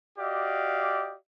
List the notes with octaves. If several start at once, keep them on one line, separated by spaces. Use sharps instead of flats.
F#4 G4 D5 D#5 F5